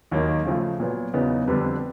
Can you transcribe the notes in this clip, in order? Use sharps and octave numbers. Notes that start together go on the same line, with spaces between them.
D#2 D#3 F#3 A#3 D#4
C#3 F3 A3
A#2 F#3 B3
E2 C#3 F#3 B3 D#4
F2 D3 G3 B3 D4